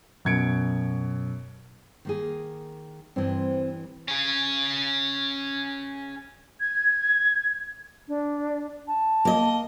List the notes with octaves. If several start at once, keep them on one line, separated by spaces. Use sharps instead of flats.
F#2 B2 G#6 C#7 D7
D#3 A#3 G#4
G2 E3 C4
C#4 G#4
G#6
D4
A5
A#3 D#5